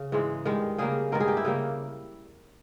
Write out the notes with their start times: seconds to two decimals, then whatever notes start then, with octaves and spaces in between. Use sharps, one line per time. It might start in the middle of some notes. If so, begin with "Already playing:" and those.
Already playing: C#3
0.12 G#2 E3 G#3
0.45 G2 D#3 G#3
0.78 C#3 G3 A#3 G#4
1.12 G2 D#3 G#3 A#4
1.20 G#4
1.28 G4
1.37 E4
1.45 C#3 G3 A#3